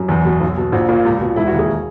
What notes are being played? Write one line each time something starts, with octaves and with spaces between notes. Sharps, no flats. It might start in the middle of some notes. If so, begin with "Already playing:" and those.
Already playing: F#2
E2
B2
B1
B2
A#1 F#4
A#2
C#2
B2
E1 E4
F#4
D#2
G#4